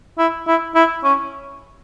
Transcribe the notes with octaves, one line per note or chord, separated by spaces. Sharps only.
E4
E4
E4
C#4